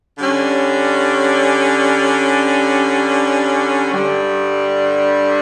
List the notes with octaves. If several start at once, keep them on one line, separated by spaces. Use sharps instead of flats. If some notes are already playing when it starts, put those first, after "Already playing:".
D3 G3 C#4
G2 D3 G3